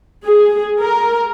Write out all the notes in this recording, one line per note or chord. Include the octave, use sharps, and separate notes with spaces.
G#4
A#4